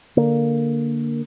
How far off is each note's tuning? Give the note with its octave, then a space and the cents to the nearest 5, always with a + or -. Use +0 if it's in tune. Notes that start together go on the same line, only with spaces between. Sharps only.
D3 +0 A#3 +0